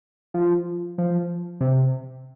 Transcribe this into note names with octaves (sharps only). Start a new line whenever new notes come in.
F3
F3
C3